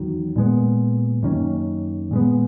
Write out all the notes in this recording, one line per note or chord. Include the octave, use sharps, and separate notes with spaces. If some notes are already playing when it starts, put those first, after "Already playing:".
Already playing: E2 D#3 F#3
A#2 G#3 B3
F#2 D#3 A#3 C#4
A#2 G#3 B3